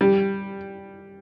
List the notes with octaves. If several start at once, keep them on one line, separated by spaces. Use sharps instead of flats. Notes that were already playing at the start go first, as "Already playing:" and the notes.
G3